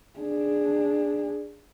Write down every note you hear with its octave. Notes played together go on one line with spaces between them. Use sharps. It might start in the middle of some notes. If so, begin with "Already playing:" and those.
D4 G#4